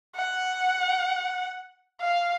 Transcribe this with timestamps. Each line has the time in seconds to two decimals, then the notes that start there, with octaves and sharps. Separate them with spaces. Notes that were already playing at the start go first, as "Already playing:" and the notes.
0.16 F#5
2.01 F5